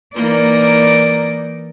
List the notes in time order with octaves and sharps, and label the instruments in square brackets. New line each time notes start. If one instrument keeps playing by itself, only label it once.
[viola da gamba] E3 A#3 A#4 [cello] D#4 D5